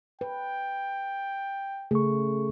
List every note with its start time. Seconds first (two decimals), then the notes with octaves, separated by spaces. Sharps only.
0.21 B4 G5
1.91 C#3 A3 G#4 A4 C#6